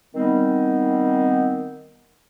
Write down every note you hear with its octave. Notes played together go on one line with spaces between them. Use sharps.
D#3 G3 B3 C4 D#4